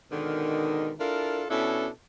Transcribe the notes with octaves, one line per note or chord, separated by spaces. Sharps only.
G#2 B2 D3 D#3
D4 E4 F4 A4 A#4
B2 C#4 D4 E4 A4